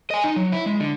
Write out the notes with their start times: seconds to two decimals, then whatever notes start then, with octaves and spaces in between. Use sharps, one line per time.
0.10 D#5 G#5
0.24 D#4
0.36 F#3
0.52 E4
0.66 G#3
0.80 D3